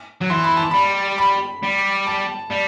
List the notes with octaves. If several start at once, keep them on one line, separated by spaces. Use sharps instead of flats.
F#3
E3 C6
B5
A5
G3 B5
B5
G3
A5
G3